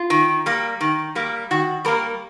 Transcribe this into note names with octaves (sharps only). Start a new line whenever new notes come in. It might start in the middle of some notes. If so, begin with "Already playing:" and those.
Already playing: F4
D#3
G3 A#3
D#3
G3 A#3
D#3 F#4
G3 A#3 A#4